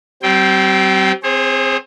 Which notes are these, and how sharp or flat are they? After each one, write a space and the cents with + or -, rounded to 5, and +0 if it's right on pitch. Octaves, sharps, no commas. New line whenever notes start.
G3 -40 C4 +0 G5 +0
C4 -10 G#4 -10 C5 +40